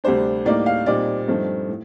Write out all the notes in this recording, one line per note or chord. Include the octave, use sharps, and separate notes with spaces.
D2 C3 G3 D4 C5
A2 G3 A#3 D#4 D5
F5
A#2 G3 C4 D#4 D5
G2 F3 A3 C4 D#4
A2